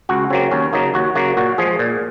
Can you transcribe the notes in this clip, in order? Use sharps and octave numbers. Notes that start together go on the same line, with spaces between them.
C#2 F#4
C#3 F#3 A#3 C4
D#2 C#4
C#3 F#3 A#3 D#4
D#2 F#4
C#3 F#3 A#3 F#4
A#2 F#4
F3 G#3 G#4
A#2